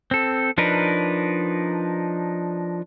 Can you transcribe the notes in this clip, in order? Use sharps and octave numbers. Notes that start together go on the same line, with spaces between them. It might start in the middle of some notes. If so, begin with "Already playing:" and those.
C4 A4
F3 D4 D#4 A#4 B4